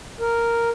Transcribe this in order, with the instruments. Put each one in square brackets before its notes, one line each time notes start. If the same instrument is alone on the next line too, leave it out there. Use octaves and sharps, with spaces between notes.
[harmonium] A#4